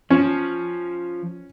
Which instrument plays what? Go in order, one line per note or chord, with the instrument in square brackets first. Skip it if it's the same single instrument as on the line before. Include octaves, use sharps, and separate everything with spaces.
[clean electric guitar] F3 [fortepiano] C#4